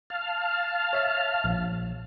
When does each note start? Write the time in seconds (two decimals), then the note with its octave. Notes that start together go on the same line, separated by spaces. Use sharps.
0.10 F5 A5 F6
0.93 C#5 E5
1.44 A#1